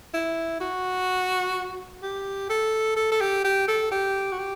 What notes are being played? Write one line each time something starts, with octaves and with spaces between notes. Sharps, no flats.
E4
F#4
G4
A4
A4
A4
G4
G4
A4
G4
F#4
G4